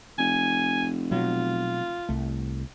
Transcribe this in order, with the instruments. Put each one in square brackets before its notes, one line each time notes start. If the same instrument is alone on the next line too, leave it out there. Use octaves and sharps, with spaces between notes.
[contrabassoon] F1 [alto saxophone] G#5
[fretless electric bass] B2 F#3 [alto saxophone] F4
[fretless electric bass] C2 A3